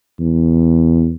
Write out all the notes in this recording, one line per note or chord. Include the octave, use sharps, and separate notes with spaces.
E2